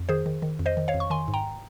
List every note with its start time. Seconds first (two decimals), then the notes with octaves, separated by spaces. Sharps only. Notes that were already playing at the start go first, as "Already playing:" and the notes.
Already playing: F2
0.09 D#3 G#4 C5
0.26 D#3
0.42 D#3
0.59 F2
0.66 C5 D#5
0.77 D#3
0.88 C#5 F5
0.94 F2
1.00 C#6
1.10 D#3 G#5 C6
1.28 G#2
1.34 G5 A#5